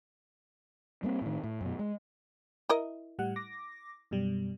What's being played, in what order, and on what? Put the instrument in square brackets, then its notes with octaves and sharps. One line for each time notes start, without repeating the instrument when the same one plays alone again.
[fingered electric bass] G3 A#3 C4
A2 D#3
A2
F#2 B2
G#3
[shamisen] E4 A#4 D#5
[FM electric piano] A2 G3 F#5
D6 A#6
F#2 B2 G3